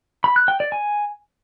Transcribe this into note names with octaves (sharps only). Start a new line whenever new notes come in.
B5
F#6
G5
D5
G#5